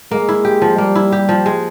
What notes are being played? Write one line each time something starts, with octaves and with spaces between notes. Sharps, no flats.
G#3 A#3
E4
G4
F3
G3 A#3
E4
G4
F3
G#3